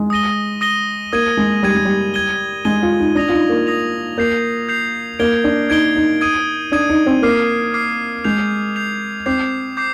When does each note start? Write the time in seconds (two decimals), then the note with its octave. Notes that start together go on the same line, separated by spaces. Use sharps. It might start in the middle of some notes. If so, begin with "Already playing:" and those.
Already playing: G#3
0.10 D#6 A#6 D#7 G7
0.61 D#6 A#6 D#7 G7
1.12 A#3 D#6 G#6 D#7
1.37 G#3
1.63 G3 D#6 G#6 D#7
1.75 G#3
1.85 G3
2.14 G#6 D#7 G7
2.65 G#3 G#6 D#7 G7
2.83 F4
3.00 D#4
3.15 D4 D#6 A#6 F7
3.29 F4
3.33 D#4
3.49 A#3
3.67 D#6 A#6 F7
4.18 A#3 G6 C7 F7
4.69 G6 C7 F7
5.19 A#3 G#6 D7 G7
5.44 D4
5.70 D#4 G#6 D7 G7
5.96 D#4
6.21 D#6 G#6 D#7
6.72 D4 D#6 G#6 D#7
6.89 D#4
7.06 C4
7.22 A#3 D6 F6 C7
7.74 D6 F6 C7
8.24 G#3 G6 C7 F7
8.76 G6 C7 F7
9.26 C4 D6 G6 C7
9.77 D6 G6 C7